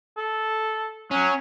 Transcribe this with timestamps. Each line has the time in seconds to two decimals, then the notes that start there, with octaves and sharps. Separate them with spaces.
0.18 A4
1.11 F#3 C#4